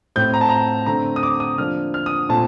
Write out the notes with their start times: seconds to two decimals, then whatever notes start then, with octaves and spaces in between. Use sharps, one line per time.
0.16 A2 A3 C4 G6
0.34 A#5
0.41 A5
0.49 A#5
0.86 D3 A3 C4 A#5
1.16 D#6
1.23 D6
1.40 D#6
1.58 D3 F3 A#3 D4 F6
1.94 F6
2.06 D#6
2.29 A#2 A3 C4 A5